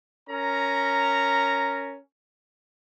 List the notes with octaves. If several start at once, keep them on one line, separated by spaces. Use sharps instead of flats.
C#4 A#4 A#5